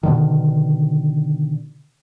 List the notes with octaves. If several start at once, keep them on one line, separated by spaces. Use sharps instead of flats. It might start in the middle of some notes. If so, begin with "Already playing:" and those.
B2 D3 D#3